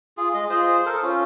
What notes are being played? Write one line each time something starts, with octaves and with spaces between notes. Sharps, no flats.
F4 G#4
G#3 D#5
F4 G#4 C5
A4 A#4 C5
C#4 F4